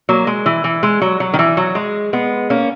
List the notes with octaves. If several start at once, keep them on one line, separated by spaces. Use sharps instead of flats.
F#3 A#3
G#3
E3
E3
G#3
F#3
F#3
D#3
E3
F#3
G#3
G#3 B3
A#3 C#4